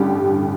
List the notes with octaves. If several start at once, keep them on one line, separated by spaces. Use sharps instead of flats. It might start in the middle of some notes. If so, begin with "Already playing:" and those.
Already playing: A1 G2 D3 G4